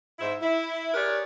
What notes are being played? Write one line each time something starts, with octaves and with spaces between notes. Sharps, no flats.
G#2 E4 C5
E4
G4 G#4 A#4 B4 C#5 D5